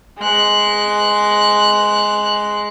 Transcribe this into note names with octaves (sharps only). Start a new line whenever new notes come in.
G#3 F#6